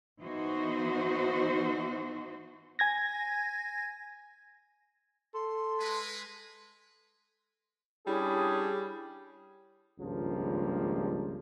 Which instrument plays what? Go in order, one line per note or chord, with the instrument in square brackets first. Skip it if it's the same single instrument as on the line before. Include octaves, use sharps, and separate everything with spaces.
[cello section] E3 B3 D#4 F#4 C5
[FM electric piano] G#5 G#6 A#6
[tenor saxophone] A4 [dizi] C6
[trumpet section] G#3 B4
[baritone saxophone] G3 [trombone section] C#4 D4 G#4 [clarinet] E4
[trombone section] G#1 C#2 G2 F3 A#3